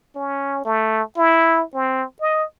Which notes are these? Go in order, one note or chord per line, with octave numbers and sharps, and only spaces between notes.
C#4
A3
E4
C4
D#5